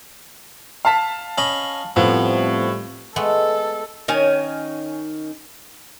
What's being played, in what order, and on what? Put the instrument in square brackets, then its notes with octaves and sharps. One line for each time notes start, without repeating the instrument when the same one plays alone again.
[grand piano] F5 A5 B6
[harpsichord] C#4 D#5 B5
[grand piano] A2 [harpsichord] F3 B3 [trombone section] G3 A3 C4
[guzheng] G#3 A3 B3 [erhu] A4
[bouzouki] D#3 C#4 G#5